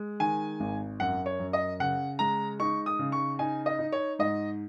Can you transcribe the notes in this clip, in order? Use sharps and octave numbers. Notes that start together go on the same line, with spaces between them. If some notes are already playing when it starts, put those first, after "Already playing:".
Already playing: G#3
D#3 G#5
G#1
F#2 F#5
C#5
F#2
D#5
C#3 F#5
G#3 A#5
D#4 C#6
D#6
C#3
C#6
D#4 G#5
D#5
D#4
C#5
G#2 D#5